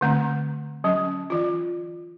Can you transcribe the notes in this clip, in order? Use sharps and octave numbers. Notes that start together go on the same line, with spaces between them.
D3 A3 C4
F#3 C#4
E3 F4